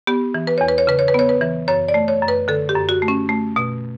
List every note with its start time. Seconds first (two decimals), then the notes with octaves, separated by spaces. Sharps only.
0.07 B3 G4
0.34 E3
0.47 B4
0.58 E2 C#5
0.68 B4
0.78 C#5
0.87 C#3 B4
0.99 C#5
1.08 B4
1.14 B3 C#5
1.29 B4
1.41 E3
1.68 F#2 C#5
1.88 D5
1.94 A3
2.08 C#5
2.22 F#2
2.28 B4
2.48 D3 A4
2.69 G4
2.75 F#2
2.89 F#4
3.02 A3
3.08 C#4
3.29 A3
3.56 B2